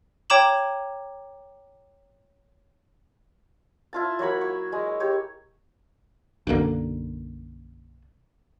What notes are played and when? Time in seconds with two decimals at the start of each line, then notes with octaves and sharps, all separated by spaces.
0.30 C#5 G5 A#5 D6 E7 F#7
3.93 E4 F4 A5
4.19 F#3 A#3 C#5 B5
4.41 C#6
4.72 G#3
5.00 G4 C#5
6.47 B1 F#2 D3 A#3